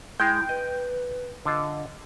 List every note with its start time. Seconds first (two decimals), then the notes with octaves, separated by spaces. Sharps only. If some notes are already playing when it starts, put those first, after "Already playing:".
0.20 G#3 E4 G5
0.49 B4 D#5
1.45 D3 F4 D#5